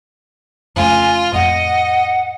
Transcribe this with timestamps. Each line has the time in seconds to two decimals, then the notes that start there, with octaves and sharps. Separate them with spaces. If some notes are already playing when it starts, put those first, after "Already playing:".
0.76 F2 C#3 A3 F4 G#5
1.33 F2 A2 D#5 F#5